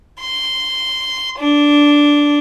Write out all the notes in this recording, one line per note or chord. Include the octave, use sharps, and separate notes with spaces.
C6
D4